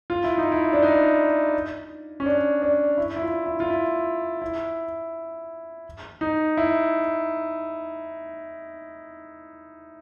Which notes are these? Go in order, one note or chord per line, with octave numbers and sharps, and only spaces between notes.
F4
E4
D#4
E4
D4
D#4
C#4
D4
D4
E4
E4
F4
E4
F4
E4
E4
D#4
E4